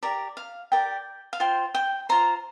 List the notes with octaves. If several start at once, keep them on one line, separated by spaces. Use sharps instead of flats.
G4 A#4 D5 A#5
F5
G4 A#4 D5 G5
F5
F4 C5 G5
G5
F4 C5 A#5